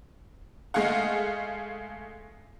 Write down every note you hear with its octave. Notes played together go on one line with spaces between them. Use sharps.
G#3 A3 G#4 F5 F#5